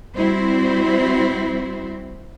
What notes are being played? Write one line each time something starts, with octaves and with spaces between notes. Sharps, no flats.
G3 C4 E4 F#4 C5